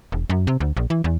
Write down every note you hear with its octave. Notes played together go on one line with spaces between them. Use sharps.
E1
F#2
C3
D2
A#1
E3
E2